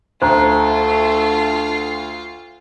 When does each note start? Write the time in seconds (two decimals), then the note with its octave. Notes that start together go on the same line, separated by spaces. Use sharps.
0.22 D2 A3 F4 C5 A#5